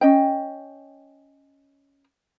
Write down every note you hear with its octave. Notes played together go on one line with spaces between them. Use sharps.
C#4 D#5 G5